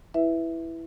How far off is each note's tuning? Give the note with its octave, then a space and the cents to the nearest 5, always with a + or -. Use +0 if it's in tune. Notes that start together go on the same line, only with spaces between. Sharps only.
E4 +0 B4 +0 E5 +0